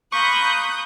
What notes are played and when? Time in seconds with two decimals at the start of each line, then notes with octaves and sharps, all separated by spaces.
0.13 F5 A#5 B5 C#6 D#6 F#6 G6